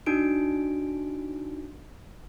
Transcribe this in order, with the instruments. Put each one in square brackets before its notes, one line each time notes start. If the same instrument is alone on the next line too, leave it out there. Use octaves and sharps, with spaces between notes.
[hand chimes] D4 D#4 F#4 D7